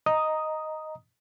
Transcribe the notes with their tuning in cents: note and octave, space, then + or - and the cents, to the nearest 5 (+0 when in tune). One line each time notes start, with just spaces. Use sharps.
D#5 +0 A#5 +0 D#6 +0